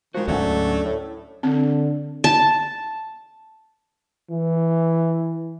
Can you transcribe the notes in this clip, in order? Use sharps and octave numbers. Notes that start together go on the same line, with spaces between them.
D#3 F3 G#3 F#4
D2 G#2 F#3 A3 C#4 D4 F#4
A2
D3 C4
A5
E3